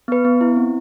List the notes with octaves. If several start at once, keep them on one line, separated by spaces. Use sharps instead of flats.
B3 B4
B3
E4
C4